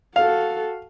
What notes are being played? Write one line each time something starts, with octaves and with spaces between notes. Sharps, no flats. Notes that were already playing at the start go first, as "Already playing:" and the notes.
F#4 A4 F5